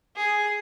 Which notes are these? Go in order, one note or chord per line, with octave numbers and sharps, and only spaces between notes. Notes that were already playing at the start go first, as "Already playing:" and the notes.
G#4